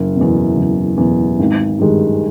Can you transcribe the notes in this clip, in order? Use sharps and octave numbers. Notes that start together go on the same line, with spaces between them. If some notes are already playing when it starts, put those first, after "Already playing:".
Already playing: F#1
E2 B2
F#1
E2 B2
G#1
G2 D#3 G#3